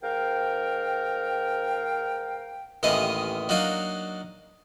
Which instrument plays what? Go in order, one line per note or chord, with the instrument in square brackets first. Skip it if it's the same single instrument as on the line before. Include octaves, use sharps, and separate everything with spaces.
[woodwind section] G#2 A#4 F5 G5
[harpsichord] A1 D#2 E3 B3 D#5 F5
F#3 A#3 D4 D#4 F#4 F5